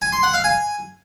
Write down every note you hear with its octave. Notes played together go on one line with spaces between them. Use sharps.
G#5
C6
F#5
F5
G#5